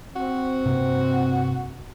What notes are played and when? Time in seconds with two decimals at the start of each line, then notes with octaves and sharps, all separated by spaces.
0.16 C4 F#4
0.65 G2 C3 A#3